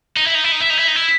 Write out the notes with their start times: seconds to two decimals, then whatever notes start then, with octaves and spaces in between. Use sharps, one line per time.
0.16 D#4
0.26 E4
0.34 D#4
0.44 E4
0.52 D#4
0.61 E4
0.70 D#4
0.79 E4
0.88 D#4
0.96 E4